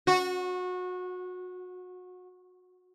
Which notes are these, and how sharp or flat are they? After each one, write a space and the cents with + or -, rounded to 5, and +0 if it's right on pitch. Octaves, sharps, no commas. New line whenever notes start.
F#4 -25